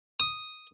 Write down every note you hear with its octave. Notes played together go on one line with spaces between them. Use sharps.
D#6